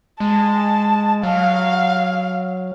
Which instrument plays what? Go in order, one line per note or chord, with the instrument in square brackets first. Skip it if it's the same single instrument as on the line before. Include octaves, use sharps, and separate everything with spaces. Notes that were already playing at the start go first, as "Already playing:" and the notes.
[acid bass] G#3 [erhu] A5
[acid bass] F#3 [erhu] F5